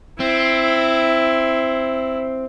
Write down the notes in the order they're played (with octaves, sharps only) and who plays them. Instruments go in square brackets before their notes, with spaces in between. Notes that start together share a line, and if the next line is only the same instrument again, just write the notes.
[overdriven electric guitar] C4 [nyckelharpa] E4